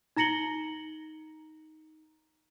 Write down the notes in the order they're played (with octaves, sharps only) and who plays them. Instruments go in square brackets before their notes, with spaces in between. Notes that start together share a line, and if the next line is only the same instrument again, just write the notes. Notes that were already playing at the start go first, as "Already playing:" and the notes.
[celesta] D#4 A#5 A#6 C#7 F#7 G7